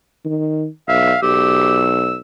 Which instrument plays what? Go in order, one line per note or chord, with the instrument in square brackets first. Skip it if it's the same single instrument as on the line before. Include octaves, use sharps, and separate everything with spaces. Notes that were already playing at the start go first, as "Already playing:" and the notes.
[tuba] D#3
[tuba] B1 [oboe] E5 [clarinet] F5
[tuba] B1 [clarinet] G4 [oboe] E6